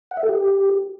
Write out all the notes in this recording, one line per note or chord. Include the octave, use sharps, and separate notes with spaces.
F#5
E5
A4
G4